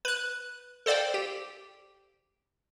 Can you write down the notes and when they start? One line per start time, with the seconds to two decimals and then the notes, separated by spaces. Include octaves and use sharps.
0.05 B4 F#6
0.86 A4 C5 D5 F5 G5
1.14 G4